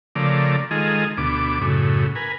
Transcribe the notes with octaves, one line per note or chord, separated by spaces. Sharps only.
C#3 F3 A3 A#4 D5
D#3 G#3 F4 G#4 A4 D#5
D2 B2 D6
F#2 A2 C#3
A#4 B4 G#5